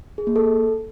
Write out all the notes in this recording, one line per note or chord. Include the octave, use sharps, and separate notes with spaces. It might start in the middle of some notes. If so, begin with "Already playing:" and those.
G#4
A#3
A4